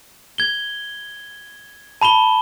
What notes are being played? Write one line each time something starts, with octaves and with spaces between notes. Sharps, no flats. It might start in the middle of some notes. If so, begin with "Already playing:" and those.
G#6 G7
A5 B5 E7 G7